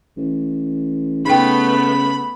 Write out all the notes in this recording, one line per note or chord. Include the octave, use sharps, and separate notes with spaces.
A1
C#3 A3 B3 D#4 G5 B5